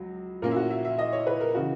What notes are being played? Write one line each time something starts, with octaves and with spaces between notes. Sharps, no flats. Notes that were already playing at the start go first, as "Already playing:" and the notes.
Already playing: C#2 F#3
A#2 A#3 C#4 A#4
E4
F#4
E5
E5
D#5
C#5
B4
A#4
C#3 E3 F#4